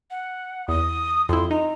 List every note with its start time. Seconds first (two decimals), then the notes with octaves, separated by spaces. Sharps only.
0.11 F#5
0.68 E2 D#6
1.29 F2 E4 C6
1.51 D#4 A#5